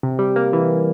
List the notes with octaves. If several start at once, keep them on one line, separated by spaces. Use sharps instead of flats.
C3
G3
A#3
E3